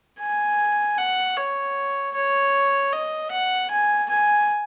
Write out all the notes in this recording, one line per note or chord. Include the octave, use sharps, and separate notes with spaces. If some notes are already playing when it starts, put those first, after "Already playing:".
G#5
F#5
C#5
C#5
D#5
F#5
G#5
G#5